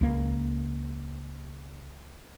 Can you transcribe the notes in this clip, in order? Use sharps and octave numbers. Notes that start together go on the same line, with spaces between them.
C#2 A#3